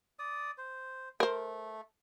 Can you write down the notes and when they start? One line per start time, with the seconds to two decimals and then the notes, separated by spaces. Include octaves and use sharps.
0.19 D5 D#6
0.58 C5
1.20 A3 A#4 C5